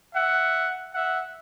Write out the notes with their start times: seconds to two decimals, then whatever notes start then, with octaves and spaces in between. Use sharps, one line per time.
0.15 E5 F#5
0.94 E5 F#5